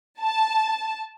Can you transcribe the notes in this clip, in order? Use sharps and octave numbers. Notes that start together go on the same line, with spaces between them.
A5